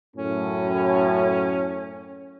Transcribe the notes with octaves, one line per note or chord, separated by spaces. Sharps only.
F#2 A2 C#4